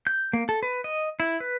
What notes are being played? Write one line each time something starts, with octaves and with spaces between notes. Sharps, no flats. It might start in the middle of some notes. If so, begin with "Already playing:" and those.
G6
A#3
A4
B4
D#5
E4
B4